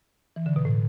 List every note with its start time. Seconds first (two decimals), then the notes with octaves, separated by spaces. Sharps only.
0.36 E3
0.46 D3
0.56 B2
0.65 A2